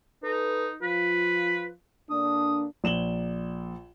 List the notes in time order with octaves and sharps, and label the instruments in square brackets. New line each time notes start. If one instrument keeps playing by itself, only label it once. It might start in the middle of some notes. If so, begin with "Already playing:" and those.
[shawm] D#4 [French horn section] A4 B4
[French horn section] F3 F4 [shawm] B4
[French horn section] D3 A#3 D4 [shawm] D#6
[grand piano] A#1 E7 F#7 G7